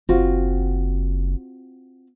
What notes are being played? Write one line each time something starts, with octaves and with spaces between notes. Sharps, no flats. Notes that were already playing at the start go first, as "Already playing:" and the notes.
F#1 C4 F4 F#4